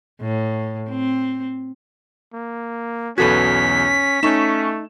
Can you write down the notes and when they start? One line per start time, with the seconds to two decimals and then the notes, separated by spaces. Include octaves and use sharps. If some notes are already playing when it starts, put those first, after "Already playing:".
0.21 A2
0.90 C4
2.33 A#3
3.18 B1 E2 C#4 F#4 A4 B4 G#6 B6
4.23 A3 C#4 D#4 C#6 E7